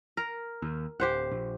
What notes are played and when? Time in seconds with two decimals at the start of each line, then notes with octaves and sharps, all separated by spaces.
0.17 A#4
0.62 D#2
1.00 D1 G4 C5 F#5
1.31 A#1